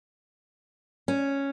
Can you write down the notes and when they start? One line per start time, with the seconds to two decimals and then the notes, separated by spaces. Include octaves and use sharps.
1.08 C#4